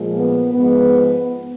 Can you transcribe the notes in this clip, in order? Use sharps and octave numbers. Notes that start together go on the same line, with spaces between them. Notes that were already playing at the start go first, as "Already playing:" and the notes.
Already playing: A#2 F3 G#3
B3
G#2 F3 G#3 B3